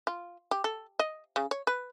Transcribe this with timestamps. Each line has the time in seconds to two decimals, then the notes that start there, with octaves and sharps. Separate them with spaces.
0.07 F4
0.51 G4
0.64 A4
0.99 D#5
1.36 C#3
1.51 C#5
1.67 B4